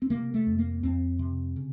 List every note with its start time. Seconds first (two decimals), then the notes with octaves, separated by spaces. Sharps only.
0.02 C4
0.10 C3 A#3
0.34 A3
0.46 F2
0.59 A#3
0.83 F2 C4
1.19 C3
1.56 C#3